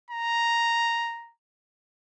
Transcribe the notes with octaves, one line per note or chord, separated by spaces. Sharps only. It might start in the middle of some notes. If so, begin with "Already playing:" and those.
A#5